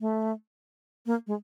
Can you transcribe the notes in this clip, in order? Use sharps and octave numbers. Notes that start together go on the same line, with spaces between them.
A3
A#3
G#3